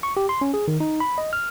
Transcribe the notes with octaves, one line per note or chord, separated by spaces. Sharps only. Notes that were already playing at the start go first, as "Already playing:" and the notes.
C#6
G4
C6
C#4
G#4
D#3
D#4
B5
D#5
F6